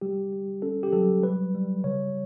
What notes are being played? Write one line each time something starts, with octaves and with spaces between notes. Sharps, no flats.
G3 G4
G3
C#4 A4
G4
F#3 A4
G3 B4
G3
C#3 C#5